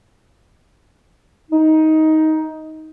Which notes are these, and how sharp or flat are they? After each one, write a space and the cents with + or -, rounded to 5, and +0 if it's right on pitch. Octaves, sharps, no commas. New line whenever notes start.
D#4 +15